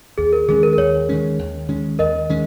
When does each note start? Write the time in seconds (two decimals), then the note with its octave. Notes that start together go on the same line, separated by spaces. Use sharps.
0.18 D#2 G#4
0.33 A#4
0.48 D#3 G#3 C#4 G#4
0.63 A#4
0.73 A#4
0.78 D#2 C#5
1.09 D#3 G#3 C#4
1.39 D#2
1.68 D#3 G#3 C#4
1.99 D#2 A#4 D#5
2.29 D#3 G#3 C#4